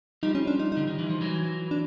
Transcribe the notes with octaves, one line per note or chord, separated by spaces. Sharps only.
F3 G3 D#4
C#4
D4
D#4
D3 D#4
D#3
E3
F3
E3 F#3
D4